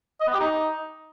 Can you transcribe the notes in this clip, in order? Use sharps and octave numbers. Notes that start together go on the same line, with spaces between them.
D#5
B3
G4
D#4